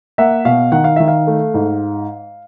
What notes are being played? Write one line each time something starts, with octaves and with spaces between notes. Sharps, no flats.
A#3 E5 F#5
B2 F5
D#3 F#5
F5
D#3 E5
F5
A3
G#2